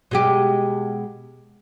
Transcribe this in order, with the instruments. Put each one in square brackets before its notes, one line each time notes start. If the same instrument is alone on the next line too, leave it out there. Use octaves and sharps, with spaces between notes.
[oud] B2 G#3 G4